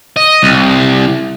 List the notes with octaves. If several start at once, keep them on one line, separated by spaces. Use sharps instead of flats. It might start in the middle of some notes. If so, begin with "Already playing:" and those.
D#5
C2